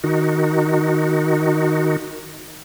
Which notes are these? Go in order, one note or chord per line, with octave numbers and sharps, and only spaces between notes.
D#3 D#4 F#4